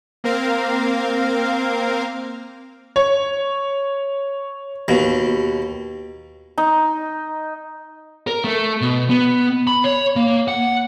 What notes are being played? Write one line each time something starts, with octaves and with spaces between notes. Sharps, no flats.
A#3 C4 A#4 F5
C#5
D#2 B2
D#4
A#4
A3
B2
B3
B5
C#5
A#3
F#5